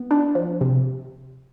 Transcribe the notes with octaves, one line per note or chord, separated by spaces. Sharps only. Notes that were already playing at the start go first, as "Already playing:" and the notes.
Already playing: B3
D4
F3
C3